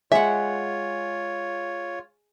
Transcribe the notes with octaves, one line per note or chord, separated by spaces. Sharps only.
G#3 F4 C#5 E5 F#5